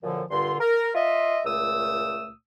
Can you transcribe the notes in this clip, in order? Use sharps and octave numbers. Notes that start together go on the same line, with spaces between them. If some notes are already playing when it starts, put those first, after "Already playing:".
F#2 A#2 D3 F3
G2 A#2 D3 F4 C6
A#4
F4 D#5 E5
C#2 A#2 A3 D#6 E6